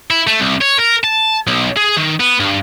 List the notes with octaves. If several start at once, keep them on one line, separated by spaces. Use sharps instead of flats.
E4
A3
C2
C#5
A#4
A5
B1
G#4
D#3
B3
G2